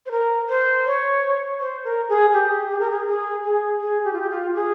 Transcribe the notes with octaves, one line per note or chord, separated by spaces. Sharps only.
C5
A#4
C5
C#5
C5
A#4
G#4
G4
G#4
A#4
G#4
G#4
G#4
G#4
G4
F4
G4
F4
G#4